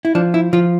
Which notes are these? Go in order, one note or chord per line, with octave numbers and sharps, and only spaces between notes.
E4
F3 D4
E4
F3 F4